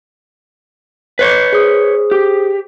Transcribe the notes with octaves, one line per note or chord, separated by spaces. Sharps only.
B4 C#5 C7
G#4 C5 D#6
G4